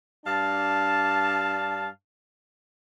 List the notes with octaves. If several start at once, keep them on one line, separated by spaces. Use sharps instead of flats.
G2 D4 F5 A5